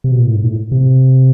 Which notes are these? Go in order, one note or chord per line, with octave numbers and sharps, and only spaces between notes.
C3
B2
A#2
A2
G#2
A#2
A2
C3